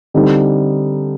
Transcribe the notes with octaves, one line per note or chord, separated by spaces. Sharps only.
D3 G3 C4 D#4